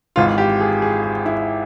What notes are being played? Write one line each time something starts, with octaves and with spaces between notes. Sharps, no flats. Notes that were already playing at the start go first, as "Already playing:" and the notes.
G#1 G#2 E3 F4
G4
G#4
G#4
G#4
E4